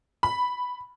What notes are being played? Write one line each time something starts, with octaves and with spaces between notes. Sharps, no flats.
B5